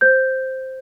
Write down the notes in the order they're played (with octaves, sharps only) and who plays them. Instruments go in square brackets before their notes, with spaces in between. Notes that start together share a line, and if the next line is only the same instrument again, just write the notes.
[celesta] C5 G6